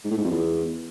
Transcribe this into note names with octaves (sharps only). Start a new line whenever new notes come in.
G#2
A2
G#2
F2
E2